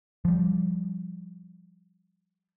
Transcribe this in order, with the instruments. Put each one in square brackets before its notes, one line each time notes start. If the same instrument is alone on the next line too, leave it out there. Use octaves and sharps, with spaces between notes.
[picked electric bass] F3 G3